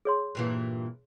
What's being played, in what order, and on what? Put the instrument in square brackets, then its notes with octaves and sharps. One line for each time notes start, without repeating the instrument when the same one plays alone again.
[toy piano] G#4 C#5 C6
[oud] G2 A#2 E3